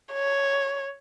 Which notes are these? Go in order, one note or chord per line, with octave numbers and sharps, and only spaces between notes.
C#5